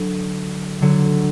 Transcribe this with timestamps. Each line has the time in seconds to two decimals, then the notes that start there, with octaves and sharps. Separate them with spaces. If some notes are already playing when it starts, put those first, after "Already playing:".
Already playing: D3 F#3
0.82 D3 F#3